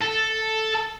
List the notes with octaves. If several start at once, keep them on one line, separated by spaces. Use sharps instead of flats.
A4